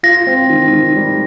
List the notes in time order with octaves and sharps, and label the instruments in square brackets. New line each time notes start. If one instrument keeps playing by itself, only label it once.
[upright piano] F4 [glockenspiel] A#6
[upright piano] C4
D#3
D#3
G3